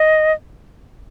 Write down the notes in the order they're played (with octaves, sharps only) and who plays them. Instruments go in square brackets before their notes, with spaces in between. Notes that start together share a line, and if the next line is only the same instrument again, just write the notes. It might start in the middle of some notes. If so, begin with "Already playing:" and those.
Already playing: [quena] D#5